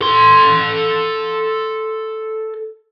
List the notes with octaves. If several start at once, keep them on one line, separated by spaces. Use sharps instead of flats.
A4 C6